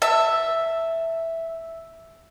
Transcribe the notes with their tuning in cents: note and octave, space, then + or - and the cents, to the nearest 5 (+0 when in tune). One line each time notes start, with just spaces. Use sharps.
E5 +0 A5 +20 E6 +0